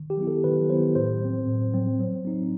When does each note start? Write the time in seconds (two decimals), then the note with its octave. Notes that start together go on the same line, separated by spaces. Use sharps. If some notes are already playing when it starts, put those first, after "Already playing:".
Already playing: D#3
0.10 G4
0.18 F#3 B3 E4
0.27 A4
0.44 D#3 B4
0.70 F#3 B3 E4 C5
0.95 A2 C5
1.22 F#3 C4
1.47 A2
1.74 F#3 C4
2.00 F#3
2.25 C4 D#4